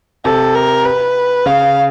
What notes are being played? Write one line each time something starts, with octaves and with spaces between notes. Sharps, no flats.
C3 A4
A#4
B4
C#3 F5